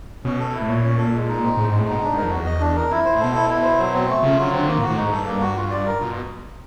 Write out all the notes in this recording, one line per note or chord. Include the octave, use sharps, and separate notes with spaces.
B2 C#4
A4
E4
A2
A#2 C#5
C#4
A4
G#3
D#4
C4
A2 G#3
G#2 G#3
A2
B2 D#4
D4
G#2 A#4
F2
E2 F#4
D#5
D4
A#4
F2 E4
C5
A2
B2 A4
E4
E4
C5
F#3
C4
A3
C#3 F4
C#3 F#3
D3
C4
D#3 A#3
A2
F#4
A2
G#2 D#4
G2 A4
A#3
F#4
F4
D5
A#4
B2 F4